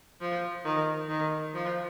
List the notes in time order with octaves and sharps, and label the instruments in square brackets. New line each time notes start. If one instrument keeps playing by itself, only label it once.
[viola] F3
D#3
D#3
F3